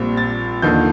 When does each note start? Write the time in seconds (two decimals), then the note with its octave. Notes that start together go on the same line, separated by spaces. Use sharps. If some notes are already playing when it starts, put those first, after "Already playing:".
Already playing: A#1 A#2 G3 C4
0.17 A6
0.62 D#2 D3 F3 A#3 D#4 G6